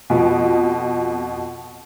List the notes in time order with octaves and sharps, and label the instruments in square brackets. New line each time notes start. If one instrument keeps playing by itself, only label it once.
[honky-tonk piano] F2 B2